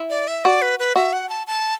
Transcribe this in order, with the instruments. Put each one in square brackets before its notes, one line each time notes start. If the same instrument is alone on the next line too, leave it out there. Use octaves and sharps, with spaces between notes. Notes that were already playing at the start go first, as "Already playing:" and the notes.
Already playing: [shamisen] E4
[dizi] D5
E5
[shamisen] F#4 [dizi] D5
[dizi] B4
B4
[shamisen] F#4 [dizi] E5
[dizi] F#5
A5
A5